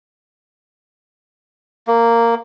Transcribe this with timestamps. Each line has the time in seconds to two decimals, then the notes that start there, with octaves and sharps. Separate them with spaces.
1.87 A#3